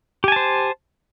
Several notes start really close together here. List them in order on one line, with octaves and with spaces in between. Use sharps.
G4 G#5 A5 C5